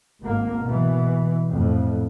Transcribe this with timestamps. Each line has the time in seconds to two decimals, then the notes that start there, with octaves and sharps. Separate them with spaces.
0.22 G#1 A#3
0.63 B2 E3
1.50 A#1 F2 A2